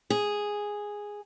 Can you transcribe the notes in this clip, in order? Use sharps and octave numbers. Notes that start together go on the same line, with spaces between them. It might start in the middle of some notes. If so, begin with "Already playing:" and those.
G#4